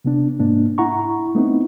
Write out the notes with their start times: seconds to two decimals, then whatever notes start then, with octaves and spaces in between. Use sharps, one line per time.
0.05 C3 B3 D4
0.40 G#2 A#3 D4
0.78 E4 F#5 A#5 C#6
1.35 A3 B3 C4 D#4 E4